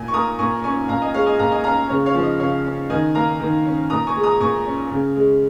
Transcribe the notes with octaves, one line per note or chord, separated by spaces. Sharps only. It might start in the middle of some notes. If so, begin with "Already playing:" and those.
Already playing: A#2 G#5
C#6
A#3 A#5 D#6
A#2 G#5 C#6
C#4 G#5 C#6
A#2 F5 A#5
D#5 G#5
G#3 C#5 F5
D#5 G#5
A#2 F5 A#5
D#5 G#5
C#4 F5 A#5
C#3 C#5
C#5 F5
F3
D#5
C#3 C#5 F5
C#4
D#3 D#5 G#5
A#3 F5 A#5
D#3
C#4
A#2 A#5 D#6
G#5 C#6
G#3
A#5 D#6
A#2 G#5 C#6
C#4
C#3
G#3